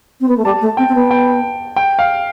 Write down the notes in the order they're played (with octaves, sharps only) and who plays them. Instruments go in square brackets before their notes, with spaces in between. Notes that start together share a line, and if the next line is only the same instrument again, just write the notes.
[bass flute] C4
B3
A3
[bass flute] G3 [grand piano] A5
[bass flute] A3
[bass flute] C4 [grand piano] G5
[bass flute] C4
B3
[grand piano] G5
G5
F5